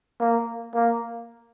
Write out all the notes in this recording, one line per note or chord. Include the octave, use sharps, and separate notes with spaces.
A#3
A#3